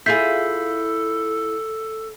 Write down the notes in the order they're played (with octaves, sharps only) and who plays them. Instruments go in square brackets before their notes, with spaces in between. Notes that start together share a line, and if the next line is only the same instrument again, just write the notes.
[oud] E4 F4 G#4 [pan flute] A4 [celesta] G6 B6 C7